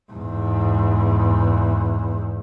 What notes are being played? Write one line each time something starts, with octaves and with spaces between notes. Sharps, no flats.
E2 G#2